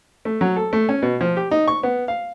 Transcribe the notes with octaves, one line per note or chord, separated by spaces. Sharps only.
A3
F#3
A4
A3
C#4
B2
F3
G4
D#4
C#6
B3
F5